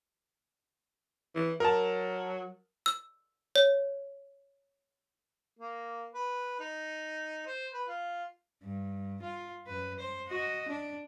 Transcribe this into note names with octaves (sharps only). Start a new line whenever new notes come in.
E3
F#3 A#4 A5
E6
C#5
A#3
B4
D#4
C5
B4
F4
G2
F4
F#2 B4
C5
F#4 D#5
D4